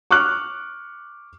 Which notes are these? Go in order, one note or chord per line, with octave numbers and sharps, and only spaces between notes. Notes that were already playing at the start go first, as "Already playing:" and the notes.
C#6 D6 F6 F#6